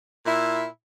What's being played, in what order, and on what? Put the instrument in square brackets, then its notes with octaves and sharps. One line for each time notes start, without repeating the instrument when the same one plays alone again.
[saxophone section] A#2 E4